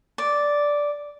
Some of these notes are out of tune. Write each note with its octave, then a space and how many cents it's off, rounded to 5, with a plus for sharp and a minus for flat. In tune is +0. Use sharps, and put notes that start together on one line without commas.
D5 -5